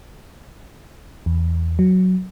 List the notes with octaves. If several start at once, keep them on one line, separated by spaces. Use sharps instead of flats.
E2
F#3